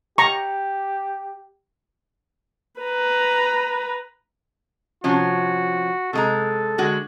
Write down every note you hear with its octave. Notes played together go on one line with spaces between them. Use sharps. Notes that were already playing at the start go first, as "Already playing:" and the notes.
G4 A#5 C#6
B4 A#5
C3 F3 C#4 F#4
C3 G#3 A4 A#5
D3 G#3 F#4